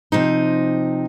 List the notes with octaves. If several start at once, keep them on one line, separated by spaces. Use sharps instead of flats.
C3 F3 D#4